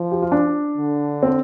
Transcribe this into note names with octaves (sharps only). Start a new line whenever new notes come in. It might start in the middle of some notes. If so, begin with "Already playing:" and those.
Already playing: F3
G4
F4
D4
D3
C4